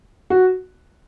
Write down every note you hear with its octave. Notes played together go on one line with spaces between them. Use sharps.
F#4